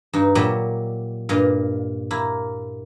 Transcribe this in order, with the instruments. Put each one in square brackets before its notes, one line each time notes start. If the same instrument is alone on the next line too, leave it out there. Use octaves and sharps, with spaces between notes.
[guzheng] G2 D#4
A#2 F#3 G3 G4 D#5 E5
G2 A#2 D#5 F5
A#3 E4